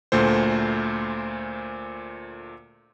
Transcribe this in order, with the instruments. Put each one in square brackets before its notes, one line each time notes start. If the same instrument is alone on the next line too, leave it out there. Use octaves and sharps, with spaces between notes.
[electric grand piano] D2 A#2 A3 C5